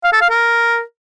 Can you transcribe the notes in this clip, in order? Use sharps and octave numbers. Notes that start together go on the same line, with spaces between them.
F5
A4
F5
A#4